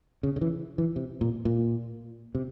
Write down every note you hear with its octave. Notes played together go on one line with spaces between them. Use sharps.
C#3
C#3
E3
E3
C3
A#2
A#2
C3